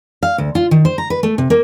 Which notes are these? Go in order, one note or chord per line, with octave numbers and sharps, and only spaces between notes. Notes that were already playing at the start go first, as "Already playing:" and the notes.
F5
D2
F4
D#3
C5
A#5
B4
A3
C3
A#3